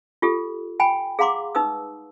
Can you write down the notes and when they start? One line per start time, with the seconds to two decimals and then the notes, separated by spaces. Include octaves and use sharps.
0.22 F4 G4 A4
0.80 G5 G#5 B5
1.19 G#4 F5 F#5 A#5 C6 D6
1.55 D#4 B4 D#6 E6